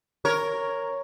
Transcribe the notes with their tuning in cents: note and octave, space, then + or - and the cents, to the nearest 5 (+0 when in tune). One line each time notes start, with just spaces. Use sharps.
A#4 +0 C#5 +0